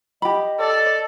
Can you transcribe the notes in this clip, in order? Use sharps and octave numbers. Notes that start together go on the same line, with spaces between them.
G4 D#5 B5
A4 D5